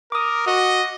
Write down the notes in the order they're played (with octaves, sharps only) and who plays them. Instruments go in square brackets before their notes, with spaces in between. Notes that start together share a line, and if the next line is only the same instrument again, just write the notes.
[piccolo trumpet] A#4 [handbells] D6 D#6
[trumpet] F#4 [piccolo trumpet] D#5